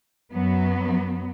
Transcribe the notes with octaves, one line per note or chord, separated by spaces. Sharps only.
F#2 F#3 B3